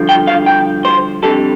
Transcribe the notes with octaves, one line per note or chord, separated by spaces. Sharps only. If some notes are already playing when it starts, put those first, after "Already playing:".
Already playing: G2 D3 F3
G5
F5
G5
C5
F2 D3 G3 A4